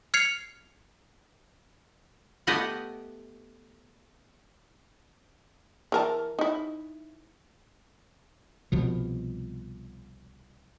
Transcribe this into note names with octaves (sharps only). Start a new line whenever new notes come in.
F6 G#6 C7 C#7 F7
A3 B3 G4 D#5 E5 F#5
E3 A#4 A5
D#4 E4
C2 B2 F3